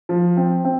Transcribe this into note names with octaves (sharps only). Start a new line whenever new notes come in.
F3
C4
C4